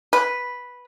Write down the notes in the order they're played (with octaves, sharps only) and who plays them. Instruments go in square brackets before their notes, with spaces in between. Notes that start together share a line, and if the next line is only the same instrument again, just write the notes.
[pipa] B4